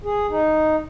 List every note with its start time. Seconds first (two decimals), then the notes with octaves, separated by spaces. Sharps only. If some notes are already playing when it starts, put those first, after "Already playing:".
0.04 G#4
0.30 D#4